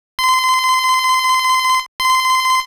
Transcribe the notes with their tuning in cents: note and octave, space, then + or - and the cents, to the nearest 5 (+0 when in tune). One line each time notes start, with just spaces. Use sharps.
C6 -25
C6 -20